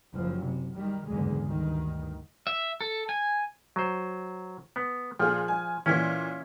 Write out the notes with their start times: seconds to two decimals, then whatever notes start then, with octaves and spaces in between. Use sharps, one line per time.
0.13 F#1 F3
0.43 C3
0.75 D#3 G3
1.07 F#1 E2 G#2 D3 G#3
1.45 D2 G2 D#3
2.47 E5
2.81 A4
3.09 G#5
3.76 F#3 C5
4.76 B3
5.19 A#2 F3 G#4
5.48 G#5
5.86 A#2 E3 C#4 E4